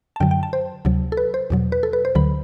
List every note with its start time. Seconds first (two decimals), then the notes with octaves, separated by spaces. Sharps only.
0.16 A5
0.20 F#2 D3 F#3 G5
0.31 G5
0.43 A5
0.53 C5
0.85 D2 C3 F#3
1.12 A4
1.17 B4
1.34 C5
1.50 E2 B2 F#3
1.72 B4
1.83 A4
1.93 B4
2.05 C5
2.15 D2 D3 F#3 B5